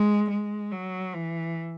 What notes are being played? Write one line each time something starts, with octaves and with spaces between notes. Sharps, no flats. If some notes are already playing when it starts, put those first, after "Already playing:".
Already playing: G#3
G#3
F#3
E3